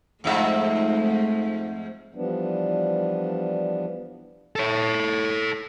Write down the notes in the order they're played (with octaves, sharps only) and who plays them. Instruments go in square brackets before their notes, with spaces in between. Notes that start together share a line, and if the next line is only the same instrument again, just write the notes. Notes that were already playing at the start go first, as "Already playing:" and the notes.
[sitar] F2 G#2 E5 [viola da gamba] G#3 A3
[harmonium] E3 F3 G3 B3 D4
[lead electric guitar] A4 C#5